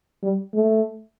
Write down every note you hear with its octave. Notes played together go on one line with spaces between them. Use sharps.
G3
A3